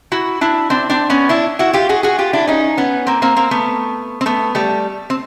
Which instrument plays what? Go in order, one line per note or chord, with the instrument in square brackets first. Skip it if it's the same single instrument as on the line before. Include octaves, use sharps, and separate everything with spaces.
[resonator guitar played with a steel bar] E4 F#4
D4 E4
C4 D4
C4 D4
B3 C#4
D4 E4
E4 F#4
F4 G4
F#4 G#4
F#4 G#4
F4 G4
D4 E4
C#4 D#4
B3 C#4
A#3 C4
A#3 C4
A#3 C4
A3 B3
C4
A3 B3
G3 A3
C4